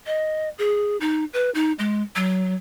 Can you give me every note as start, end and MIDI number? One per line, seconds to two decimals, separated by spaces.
0.06 0.49 75
0.59 0.97 68
1.01 1.25 63
1.34 1.50 71
1.55 1.73 63
1.79 2.03 56
2.16 2.55 54